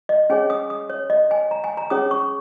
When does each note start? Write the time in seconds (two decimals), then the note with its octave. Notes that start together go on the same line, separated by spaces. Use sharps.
0.09 D#5
0.30 C#4 G#4 C#5 G#5
0.50 D#6
0.70 D#6
0.90 C#5
1.10 D#5
1.31 G#5
1.51 A#5
1.64 G#5
1.77 A#5
1.90 C#4 G#4 C#5 D#6
2.11 C#6